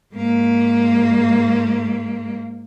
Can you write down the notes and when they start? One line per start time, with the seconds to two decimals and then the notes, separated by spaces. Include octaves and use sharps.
0.14 G#2 A#3